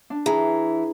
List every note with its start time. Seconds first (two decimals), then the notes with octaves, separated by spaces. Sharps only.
0.10 D4
0.26 E3 G#4 A#5